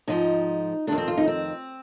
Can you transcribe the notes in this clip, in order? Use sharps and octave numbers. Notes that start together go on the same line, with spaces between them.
G#2 F3 D#4
F2 D#3 D4
C4
F4
D#4
C4